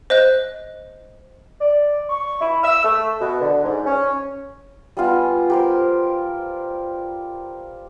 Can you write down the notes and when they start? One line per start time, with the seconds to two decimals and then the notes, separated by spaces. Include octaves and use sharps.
0.10 C5 D#5 F#6
1.60 D5
2.10 C#6
2.40 E4
2.63 E6
2.84 A3
3.20 B2
3.41 D3
3.63 G#2
3.86 C#4
4.97 G3 B3 F4 G#5
5.50 G4 A#4 C5